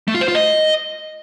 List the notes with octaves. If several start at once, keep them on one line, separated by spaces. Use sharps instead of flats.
A3
F4
C5
F4
D#5